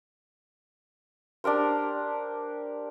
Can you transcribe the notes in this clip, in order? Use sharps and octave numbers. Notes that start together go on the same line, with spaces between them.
D4 G4 A#4 C5